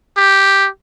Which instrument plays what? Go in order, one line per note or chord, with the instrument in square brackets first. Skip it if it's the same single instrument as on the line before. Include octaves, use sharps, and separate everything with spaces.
[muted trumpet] G4